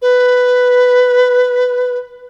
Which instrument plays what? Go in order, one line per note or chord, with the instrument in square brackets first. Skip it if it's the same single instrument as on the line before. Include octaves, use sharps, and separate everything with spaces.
[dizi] B4